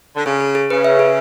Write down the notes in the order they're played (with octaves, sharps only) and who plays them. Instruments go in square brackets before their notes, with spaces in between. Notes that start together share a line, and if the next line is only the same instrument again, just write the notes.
[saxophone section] D3
[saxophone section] C#3 [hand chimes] G#4
[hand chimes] G#4
G#4
[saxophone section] C#3 [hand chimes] B4
[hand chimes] E5
G#4